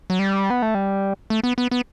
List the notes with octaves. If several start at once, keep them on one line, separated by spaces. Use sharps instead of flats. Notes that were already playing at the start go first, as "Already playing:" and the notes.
F#3
G3
B3
A3
G3
A3
B3
B3
B3